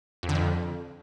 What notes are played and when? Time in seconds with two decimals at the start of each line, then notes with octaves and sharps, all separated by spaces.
0.23 F2
0.29 D3
0.35 F2